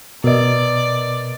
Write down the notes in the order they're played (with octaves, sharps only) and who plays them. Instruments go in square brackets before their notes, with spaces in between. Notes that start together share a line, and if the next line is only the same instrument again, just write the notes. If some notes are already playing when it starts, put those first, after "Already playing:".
[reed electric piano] B2 [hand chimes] A#4 B4 D#5 [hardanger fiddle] D5